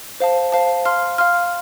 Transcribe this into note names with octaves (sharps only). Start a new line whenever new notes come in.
C5 F5 A5
C5 F5 A5
F5 C6 F6
F5 C6 F6